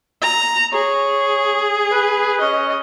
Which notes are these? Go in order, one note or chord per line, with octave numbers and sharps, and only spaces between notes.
A#5
G#4 C#5
B4
C#4 D#5